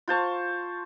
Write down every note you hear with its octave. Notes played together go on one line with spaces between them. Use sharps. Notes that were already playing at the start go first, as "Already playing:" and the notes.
F4 C5 A5 C#6